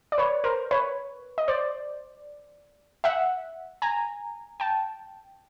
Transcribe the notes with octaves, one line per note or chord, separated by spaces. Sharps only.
D5
B4 C#5
A#4 C5
B4 C#5
D#5
C5 D5
E5 F#5
G#5 A#5
G5 A5